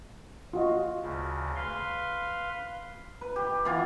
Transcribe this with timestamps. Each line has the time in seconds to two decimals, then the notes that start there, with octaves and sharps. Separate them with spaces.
0.53 F4 F#4 D#5
1.02 D2 C#3
1.56 B4 F5 C6
3.21 B4
3.36 G4
3.65 E3 B3 F4